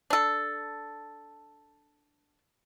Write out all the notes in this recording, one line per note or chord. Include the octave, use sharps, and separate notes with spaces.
D4 A4